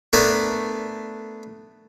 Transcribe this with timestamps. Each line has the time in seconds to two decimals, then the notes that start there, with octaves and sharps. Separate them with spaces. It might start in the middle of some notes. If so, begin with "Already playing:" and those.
0.13 A3 B3 D4 A#4 D5 G#5